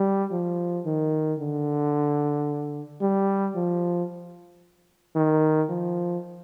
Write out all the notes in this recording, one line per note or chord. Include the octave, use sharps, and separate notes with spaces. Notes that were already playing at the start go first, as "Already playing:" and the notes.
Already playing: G3
F3
D#3
D3
G3
F3
D#3
F3